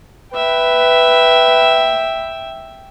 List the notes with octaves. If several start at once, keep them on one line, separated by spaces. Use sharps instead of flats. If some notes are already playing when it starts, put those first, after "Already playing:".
B4 E5 G5